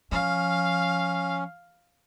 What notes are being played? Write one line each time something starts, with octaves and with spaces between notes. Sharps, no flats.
F3 C#4 F5